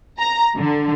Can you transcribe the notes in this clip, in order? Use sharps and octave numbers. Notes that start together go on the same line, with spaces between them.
A#5
D3